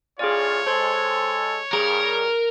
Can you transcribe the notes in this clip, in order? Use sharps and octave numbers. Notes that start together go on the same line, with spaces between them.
A2 C#4 F4 G#4 C#5 D5
G#3 A4 C5 C6 G#6
G2 G#4 A#4